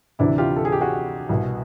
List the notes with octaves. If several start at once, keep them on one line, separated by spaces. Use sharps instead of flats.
D2 C3 E3 D4 E4
F4 G4
A4
G#4
G4
F#4 G#4
C2 B2